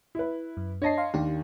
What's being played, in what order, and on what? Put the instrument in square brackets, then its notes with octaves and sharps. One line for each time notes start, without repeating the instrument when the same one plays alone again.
[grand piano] E4 B4
[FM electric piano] F#2
[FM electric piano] D4 A#6 C7 [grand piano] C#5 D#5 A5
[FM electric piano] F5 C6
[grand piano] D#2 [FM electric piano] D4 G4